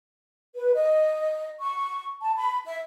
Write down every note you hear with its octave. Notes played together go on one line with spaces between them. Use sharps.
B4
D#5
C#6
A5
B5
E5